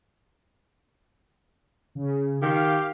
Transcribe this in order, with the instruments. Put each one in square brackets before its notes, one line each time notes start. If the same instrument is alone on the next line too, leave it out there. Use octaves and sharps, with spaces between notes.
[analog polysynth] C#3
[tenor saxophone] D#3 [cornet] G4 [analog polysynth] F5